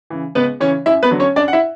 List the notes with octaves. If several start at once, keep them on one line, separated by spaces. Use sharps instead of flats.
C#3 E3
C#2 B3 B4
C#3 E3 C#4 C#5
F#2 E4 E5
B3 B4
D3 F#3
C#4 C#5
F#2 D4 D5
F#5
E4 E5